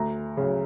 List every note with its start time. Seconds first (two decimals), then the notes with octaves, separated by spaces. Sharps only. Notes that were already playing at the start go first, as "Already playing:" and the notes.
Already playing: D2 A#5
0.37 C#3 F#3